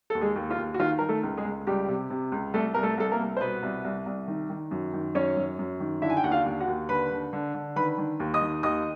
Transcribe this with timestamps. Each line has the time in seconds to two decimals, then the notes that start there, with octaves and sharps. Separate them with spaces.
0.10 D#2 A4
0.21 G#3 G#4
0.36 D#2
0.50 F4
0.58 D#2
0.74 F#4
0.79 D#3 F4
0.99 D#3 A#4
1.09 A3 A4
1.23 C#2
1.37 G#3 G#4
1.45 C#2
1.67 C#2 G3 G4
1.88 C3
2.10 C3
2.32 C#2
2.54 C2 A3 A4
2.74 C2 A#4
2.83 A3 A4
2.98 C2 A4
3.12 A#3 A#4
3.19 C2
3.37 C5
3.41 B2 B3 B4
3.63 C2
3.84 C2
4.06 C2
4.28 D#3
4.50 D#3
4.71 F#2
4.93 D#3
5.15 F#2 C#4 C#5
5.37 F#2
5.59 F#2
5.80 D#3
6.02 D3 E4 E5
6.10 G#5
6.17 G5
6.24 D#2 F#5
6.31 F4 F5
6.46 D#2
6.60 F#4 F#5
6.68 D#2
6.89 D3 B4 B5
7.11 D3
7.33 D3
7.54 D3
7.76 D#3 B4 B5
7.98 D#3
8.20 D#2
8.34 D#5 D#6
8.41 D#3
8.63 D#2 D#5 D#6